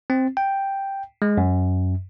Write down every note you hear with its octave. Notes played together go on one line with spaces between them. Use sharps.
C4
G5
G#3
F#2